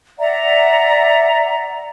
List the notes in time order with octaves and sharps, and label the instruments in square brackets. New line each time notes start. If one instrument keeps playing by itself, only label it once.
[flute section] D5 E5 F#5 A#5